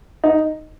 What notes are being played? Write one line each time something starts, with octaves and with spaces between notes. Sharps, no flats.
D#4